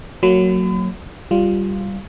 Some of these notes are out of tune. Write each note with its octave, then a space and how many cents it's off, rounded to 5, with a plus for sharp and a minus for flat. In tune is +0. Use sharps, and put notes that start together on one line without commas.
F#3 +0 A#3 -25 B5 +40
G3 -5 F4 +0